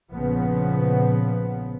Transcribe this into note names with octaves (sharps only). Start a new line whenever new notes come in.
A#1 C#3 F3 B3